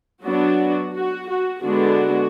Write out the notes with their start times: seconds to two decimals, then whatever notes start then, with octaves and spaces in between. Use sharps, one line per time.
0.23 F#3 B3 D4 F#4
0.94 F#4
1.29 F#4
1.64 D3 G#3 B3 D4 F#4